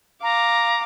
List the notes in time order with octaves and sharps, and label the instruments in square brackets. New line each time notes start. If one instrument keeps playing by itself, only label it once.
[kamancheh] F5 D6 [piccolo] A#5